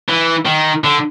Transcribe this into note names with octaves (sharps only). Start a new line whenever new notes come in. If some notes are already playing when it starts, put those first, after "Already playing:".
E3
D#3
D3